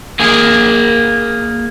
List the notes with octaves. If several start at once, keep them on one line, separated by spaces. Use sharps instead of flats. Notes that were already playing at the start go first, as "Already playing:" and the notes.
A#3 G#4